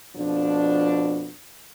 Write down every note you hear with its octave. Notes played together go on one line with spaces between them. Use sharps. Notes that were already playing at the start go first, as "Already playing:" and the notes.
F2 B2 F3 D4